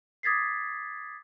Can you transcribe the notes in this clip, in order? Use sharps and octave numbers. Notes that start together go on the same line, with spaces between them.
D6 D#6 G#6 A6 B6 C7